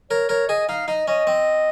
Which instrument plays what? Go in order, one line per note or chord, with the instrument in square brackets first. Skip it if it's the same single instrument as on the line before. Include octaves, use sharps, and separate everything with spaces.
[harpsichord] A#4 [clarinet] C#5
[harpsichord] A#4 [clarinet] C#5
[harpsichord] G#4 [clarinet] D#5
[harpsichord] D#4 [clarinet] F5
[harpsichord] D#4 [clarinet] D#5
[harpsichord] C#4 [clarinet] D#5
[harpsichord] C4